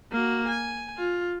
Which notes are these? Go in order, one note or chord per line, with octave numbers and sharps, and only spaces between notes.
A#3 F#4
G#5
F4